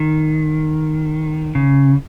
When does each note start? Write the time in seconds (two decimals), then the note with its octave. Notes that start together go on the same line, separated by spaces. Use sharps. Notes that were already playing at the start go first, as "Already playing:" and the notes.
Already playing: D#3
1.55 C#3